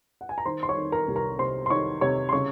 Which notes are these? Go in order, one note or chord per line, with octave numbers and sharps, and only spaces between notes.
F#5
G#5
A#5
D#3 C5 C6
C6
C#5 C#6
D#3
A#4 A#5
C2
A#4 A#5
C3 C5 C6
C6
D#3 C#5 C#6
C3 C#5 C#6
C6
C#3 C#5 C#6